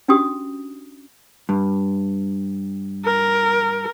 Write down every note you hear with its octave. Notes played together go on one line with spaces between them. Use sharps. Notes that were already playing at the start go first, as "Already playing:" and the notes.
C#4 D4 F#4 G4 D#6
G2
A#4